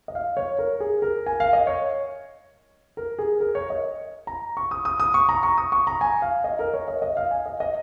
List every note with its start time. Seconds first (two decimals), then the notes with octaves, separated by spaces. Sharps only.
0.08 D#5
0.15 F5
0.37 C#5
0.59 A#4
0.80 G#4
1.02 A#4
1.26 G#5
1.40 F5
1.53 D#5
1.67 C#5
2.97 A#4
3.19 G#4
3.40 A#4
3.55 C#5
3.70 D#5
4.27 A#5
4.57 C#6
4.71 D#6
4.85 D#6
5.00 D#6
5.14 C#6
5.29 A#5
5.43 C#6
5.58 D#6
5.72 C#6
5.87 A#5
6.01 G#5
6.22 F5
6.44 D#5
6.59 A#4
6.74 C#5
6.88 D#5
7.02 D#5
7.17 F5
7.31 G#5
7.46 D#5
7.60 D#5